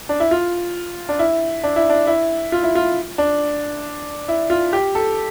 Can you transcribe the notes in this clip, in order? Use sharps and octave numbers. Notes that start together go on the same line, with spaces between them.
D4
E4
F4
D4
E4
D4
E4
D4
E4
F4
E4
F4
D4
E4
F4
G4
A4